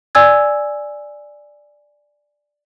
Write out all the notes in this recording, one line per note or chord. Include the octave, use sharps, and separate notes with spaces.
D5 G#5 E6 G#6